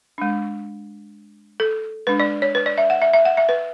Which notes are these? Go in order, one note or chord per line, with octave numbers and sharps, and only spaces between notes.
G#3 D4
A4
G#3 D4 B4
D5
C#5
B4
D5
E5
F#5
E5
E5
F#5
E5
B4